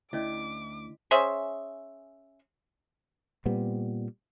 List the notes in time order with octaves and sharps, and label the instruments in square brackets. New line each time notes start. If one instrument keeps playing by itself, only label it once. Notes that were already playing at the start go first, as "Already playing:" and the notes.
[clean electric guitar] D2 [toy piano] C#4 D5 D#5 [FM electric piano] E4 [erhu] D6
[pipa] C#4 G#4 C5 E5
[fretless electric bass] A#2 G3 B3 C4